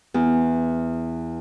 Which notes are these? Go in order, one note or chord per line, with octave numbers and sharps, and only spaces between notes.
E2